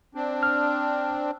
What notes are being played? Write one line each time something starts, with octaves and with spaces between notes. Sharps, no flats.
C4 D4
F6